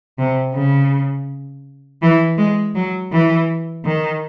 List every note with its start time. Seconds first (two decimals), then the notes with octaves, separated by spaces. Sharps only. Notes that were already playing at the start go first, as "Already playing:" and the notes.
0.19 C3
0.54 C#3
2.02 E3
2.38 G#3
2.75 F#3
3.12 E3
3.85 D#3